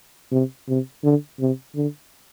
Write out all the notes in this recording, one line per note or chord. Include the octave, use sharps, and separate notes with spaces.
C3
C3
D3
C3
D3